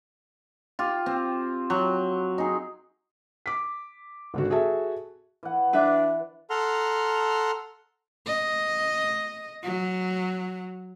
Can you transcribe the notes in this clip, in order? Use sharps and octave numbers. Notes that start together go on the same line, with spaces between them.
F4 G4
C4
F#3
D#4 G#4
D6 B6
G#1 D3 F#4
F#4 G#4 A4 E5 A5
E3 F#5
D4 B4 E5
A4 F#5 A#5 C6 F6
D#5
F#3